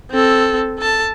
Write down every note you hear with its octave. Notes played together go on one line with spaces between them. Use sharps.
C4 A4
A4 A5